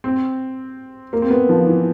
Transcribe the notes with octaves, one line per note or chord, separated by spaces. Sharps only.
C4
A#3
C4
B3
F3
E3